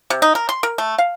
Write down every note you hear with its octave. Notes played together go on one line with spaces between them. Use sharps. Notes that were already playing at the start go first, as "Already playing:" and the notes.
C3
D#4
A#4
C6
A#4
A3
F5